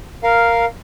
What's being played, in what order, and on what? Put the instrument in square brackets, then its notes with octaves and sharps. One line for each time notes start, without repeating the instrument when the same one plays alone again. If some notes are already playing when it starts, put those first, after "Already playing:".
[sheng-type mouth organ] A#4 F5